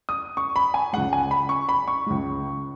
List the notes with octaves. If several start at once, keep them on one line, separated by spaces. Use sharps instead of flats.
D#6
C#6
B5
G#5
C#2 C#3 G#3 F#5
G#5
B5
C#6
B5
C#6
C#2 C#3 G#3